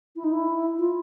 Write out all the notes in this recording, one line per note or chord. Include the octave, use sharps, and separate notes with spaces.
E4
D#4
E4
F4